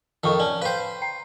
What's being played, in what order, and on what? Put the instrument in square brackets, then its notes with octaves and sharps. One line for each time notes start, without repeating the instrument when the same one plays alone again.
[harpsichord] F2 D#3 [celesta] F4 C#6
[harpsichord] C#4 [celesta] D5 A5
[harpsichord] B4 C5 [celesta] F5 G5
[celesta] G5 A#5 C7